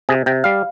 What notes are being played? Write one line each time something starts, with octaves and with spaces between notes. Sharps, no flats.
C3 G#4
C3 G5
G3 F5